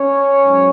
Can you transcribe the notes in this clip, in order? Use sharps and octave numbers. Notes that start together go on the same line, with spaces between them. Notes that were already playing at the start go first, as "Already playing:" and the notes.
Already playing: C#4 C#5
G#2 F#3